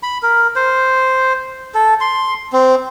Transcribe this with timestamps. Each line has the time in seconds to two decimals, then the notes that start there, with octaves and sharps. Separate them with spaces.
0.03 B5
0.23 A#4
0.56 C5
1.74 A4
2.01 C6
2.53 C4